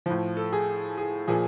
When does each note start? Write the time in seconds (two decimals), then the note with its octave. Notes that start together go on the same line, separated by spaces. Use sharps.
0.06 A2 F3
0.37 A4
0.52 G#4
0.97 G#4
1.28 A#2 F3 G#4